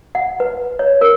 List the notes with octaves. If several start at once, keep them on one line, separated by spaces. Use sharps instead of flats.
F#5
B4
C#5
A#4